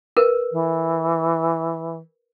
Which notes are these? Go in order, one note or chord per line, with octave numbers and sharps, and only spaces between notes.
A#4 B4
E3